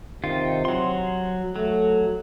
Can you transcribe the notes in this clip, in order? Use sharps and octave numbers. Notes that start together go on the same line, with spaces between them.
C3 D#3 F4
F#3 C6
F#3 A3